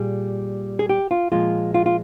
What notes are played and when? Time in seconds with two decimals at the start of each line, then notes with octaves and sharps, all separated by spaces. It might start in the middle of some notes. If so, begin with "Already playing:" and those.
Already playing: A#2 G3 G#4
0.79 G#4
0.89 G4
1.11 F4
1.32 A#2 F3 G#3 F4
1.74 F4
1.86 F4